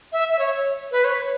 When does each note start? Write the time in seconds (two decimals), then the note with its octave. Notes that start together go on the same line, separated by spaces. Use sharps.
0.12 E5
0.32 E5
0.39 C#5
0.92 B4
1.04 C#5